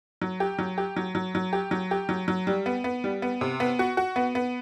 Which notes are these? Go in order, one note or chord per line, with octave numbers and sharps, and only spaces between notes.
F#3
G4
F#3
G4
F#3
F#3
F#3
G4
F#3
G4
F#3
F#3
G3
B3
B3
G3
B3
C3
B3
F#4
F#4
B3
B3